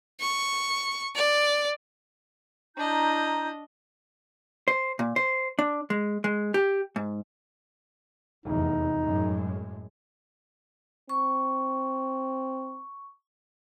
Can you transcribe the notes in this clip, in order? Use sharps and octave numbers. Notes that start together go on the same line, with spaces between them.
C#6
D5
D4 E4 D#5 A#5 G6
C5
A#2
C5
D4
G#3
G#3
G4
G#2
F1 E2 D#4
F#2 A2 G#3
C4 C#6